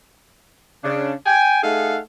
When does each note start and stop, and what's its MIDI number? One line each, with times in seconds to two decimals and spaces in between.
0.83 1.13 49
0.83 1.13 62
1.26 1.62 79
1.26 1.62 80
1.63 1.99 57
1.63 1.99 63
1.63 1.99 68
1.63 1.99 69
1.63 1.99 77
1.63 1.99 78